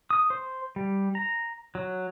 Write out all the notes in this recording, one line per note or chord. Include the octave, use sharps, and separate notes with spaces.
D#6
C5
G3
A#5
F#3